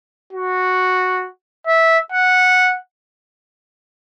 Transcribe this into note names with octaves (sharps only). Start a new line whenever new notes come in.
F#4
E5
F#5